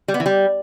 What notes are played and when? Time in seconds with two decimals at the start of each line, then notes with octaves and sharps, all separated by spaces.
0.08 G3
0.14 B3
0.20 E3
0.26 G3